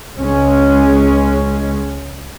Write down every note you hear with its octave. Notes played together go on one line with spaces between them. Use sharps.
C#2 G#3 C#4